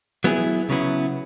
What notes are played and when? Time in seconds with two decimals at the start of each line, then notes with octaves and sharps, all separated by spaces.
0.24 F#3 B3 E4 G#4
0.70 C#3 F#3 B3 E4